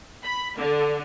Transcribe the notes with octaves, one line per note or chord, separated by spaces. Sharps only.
B5
D3